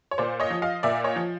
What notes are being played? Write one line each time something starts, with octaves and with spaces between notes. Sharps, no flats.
C#5
A#2 C5 D5
C#5 D#5
F3
D#5 F5
A#2 D5 E5
C#5 D#5
F3